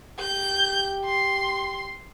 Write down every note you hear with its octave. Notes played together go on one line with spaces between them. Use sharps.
G4 G6
C6